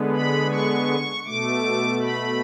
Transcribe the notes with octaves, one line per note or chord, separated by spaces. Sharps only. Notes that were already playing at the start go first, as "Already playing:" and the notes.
Already playing: D3 G#3 B3
B5
C#6
B2 A3 D6
B5